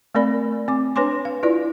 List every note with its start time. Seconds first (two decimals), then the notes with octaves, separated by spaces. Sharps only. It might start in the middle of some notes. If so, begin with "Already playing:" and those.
0.15 A3 C4 A#4 D5 B5
0.68 C4 D6
0.96 D4 B4 C#5 G#5 C6 D6
1.25 F5
1.43 E4 F4 B4 D5